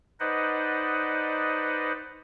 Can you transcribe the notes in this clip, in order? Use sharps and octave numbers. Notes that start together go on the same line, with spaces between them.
D#4 B4 C5 D5 D#5 F#5